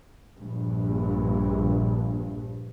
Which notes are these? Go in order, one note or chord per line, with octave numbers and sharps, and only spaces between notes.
A#1 G2